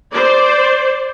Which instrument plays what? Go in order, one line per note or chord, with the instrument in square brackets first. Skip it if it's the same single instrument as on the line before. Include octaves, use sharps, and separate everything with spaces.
[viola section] C5 D5